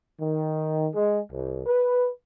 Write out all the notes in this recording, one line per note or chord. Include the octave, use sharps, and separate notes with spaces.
D#3
G#3
C2
B4